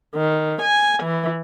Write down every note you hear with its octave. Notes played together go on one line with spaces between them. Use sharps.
D#3
G#5
E3